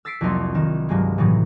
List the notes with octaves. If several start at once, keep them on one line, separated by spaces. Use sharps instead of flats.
E6 A6 B6 C7 D7
C2 F2 F#3 A#3 D#4 C6
D#3 D#4 E7
G2 F#3 G#3 A#3
A2 C3 E3 F#3 D#4